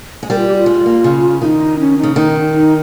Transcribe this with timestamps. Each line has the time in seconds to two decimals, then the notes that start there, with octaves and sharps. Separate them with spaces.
0.23 G#3
0.30 G3 A#4
0.38 F4
0.48 G4
0.57 F4
0.66 G#3
0.86 A#3
1.04 C#3
1.41 D#3 D#4 F4
1.79 C#4
1.98 D#4
2.03 C#3
2.16 D#3 D#4
2.54 D#4